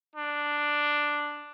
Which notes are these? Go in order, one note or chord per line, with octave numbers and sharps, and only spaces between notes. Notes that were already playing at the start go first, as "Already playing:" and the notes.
D4